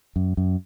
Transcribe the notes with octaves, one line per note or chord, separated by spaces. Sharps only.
F#2
F#2